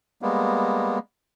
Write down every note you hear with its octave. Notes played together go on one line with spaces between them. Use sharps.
G3 G#3 A#3 B3